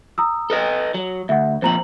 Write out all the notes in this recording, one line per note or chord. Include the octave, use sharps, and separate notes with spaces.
A#5 D#6 E6
A4 B4 D#5
F#3
D2 E5 F#5
F2 A#2 C4 C5 A#5 F#7